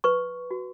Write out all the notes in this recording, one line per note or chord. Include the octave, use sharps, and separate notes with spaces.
B4 C#6
F#4